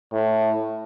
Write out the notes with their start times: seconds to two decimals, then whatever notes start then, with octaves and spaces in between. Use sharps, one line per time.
0.13 A2